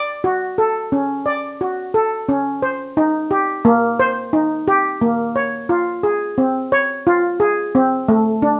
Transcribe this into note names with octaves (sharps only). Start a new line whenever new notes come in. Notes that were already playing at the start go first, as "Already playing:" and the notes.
Already playing: D5
F#4
A4
C#4
D5
F#4
A4
C#4
C5
D#4
G4
A#3
C5
D#4
G4
A#3
C#5
F4
G#4
C4
C#5
F4
G#4
C4
A3
D4